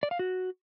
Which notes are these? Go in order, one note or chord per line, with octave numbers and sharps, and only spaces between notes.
D5
F5
F#4